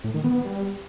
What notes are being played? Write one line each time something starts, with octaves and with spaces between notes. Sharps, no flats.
A2
D#3
B3
B3
G3